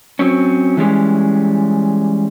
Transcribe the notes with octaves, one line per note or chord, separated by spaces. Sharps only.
F#3 C4 C#4
E3 G3 G#3 C#4